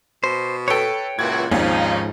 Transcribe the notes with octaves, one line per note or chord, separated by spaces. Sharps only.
B2 C5
A4 B4 C#5 G5
C#2 A#2 E3 F#4 G#6
G#1 D#2 G#2 F3 C#4 D#4